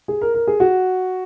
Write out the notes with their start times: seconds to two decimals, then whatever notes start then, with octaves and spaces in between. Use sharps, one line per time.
0.08 G#4
0.21 A#4
0.34 A#4
0.47 G#4
0.60 F#4